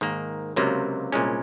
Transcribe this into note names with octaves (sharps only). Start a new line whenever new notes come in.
G#2 D#3 A#3
C#2 C3 F#3 A#3
C2 A#2 G#3 C#4